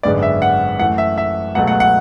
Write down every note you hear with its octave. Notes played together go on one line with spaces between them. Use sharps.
G#1 F#2 D3 G#3 B3 D5
E5
F#5
F#2 E3 A3 F#5
E5
E5
C#2 B2 F#3 A3 F#5
F#5
F#5